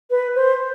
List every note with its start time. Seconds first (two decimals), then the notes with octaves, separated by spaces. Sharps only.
0.10 B4
0.35 C5